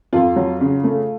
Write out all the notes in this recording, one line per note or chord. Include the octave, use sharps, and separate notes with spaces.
F2 F4
F#3
C#3
A3